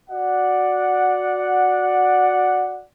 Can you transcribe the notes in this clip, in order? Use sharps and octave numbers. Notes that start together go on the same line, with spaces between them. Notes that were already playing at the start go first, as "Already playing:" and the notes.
F#4 D5 F#5